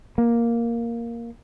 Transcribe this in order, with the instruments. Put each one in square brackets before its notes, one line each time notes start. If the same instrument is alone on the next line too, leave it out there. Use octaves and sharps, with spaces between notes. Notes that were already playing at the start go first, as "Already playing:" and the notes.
[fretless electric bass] A#3